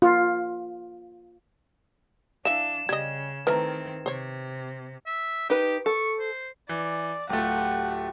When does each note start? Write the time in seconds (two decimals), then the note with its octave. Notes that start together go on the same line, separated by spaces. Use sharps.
0.02 F4
2.45 E3 D4 E5 F5 E7
2.89 C#3 G3 D#5 G#6
3.47 D#3 E3 A3 C4 B4 A#5
4.06 C3 C5 C#5
5.07 E5
5.50 D#4 G4 B4
5.86 A4 C#6
6.20 C5
6.69 E3 D5
7.29 D1 A3 F4 G4 F#5